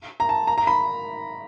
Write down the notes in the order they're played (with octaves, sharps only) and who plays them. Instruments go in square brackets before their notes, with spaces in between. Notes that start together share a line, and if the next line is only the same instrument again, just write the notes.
[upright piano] A#5
A5
A#5
A#5
B5